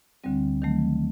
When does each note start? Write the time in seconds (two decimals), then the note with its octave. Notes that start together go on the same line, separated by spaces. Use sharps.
0.24 D2 D3 G3 C4
0.62 D#3 F#3 A3